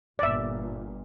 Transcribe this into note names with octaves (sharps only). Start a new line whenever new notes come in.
G1 A#2 D5 E5